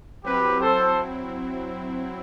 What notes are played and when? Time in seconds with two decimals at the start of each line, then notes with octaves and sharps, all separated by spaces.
0.24 F#3 C4 E4 G4 B4
0.61 A4 C5